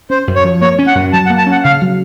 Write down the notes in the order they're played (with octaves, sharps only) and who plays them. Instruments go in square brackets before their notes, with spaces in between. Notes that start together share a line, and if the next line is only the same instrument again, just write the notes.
[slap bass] C#4 [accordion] C5
[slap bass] F#2
[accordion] C#5
[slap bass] F3
[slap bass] A#3 [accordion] C#5
[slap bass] C#4
[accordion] F#5
[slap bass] F#2
[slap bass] F#3 [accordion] A5
[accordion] F#5
[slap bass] A#3
[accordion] A5
[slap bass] C#4
[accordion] F#5
[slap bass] C#3 [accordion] F5
[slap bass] F#3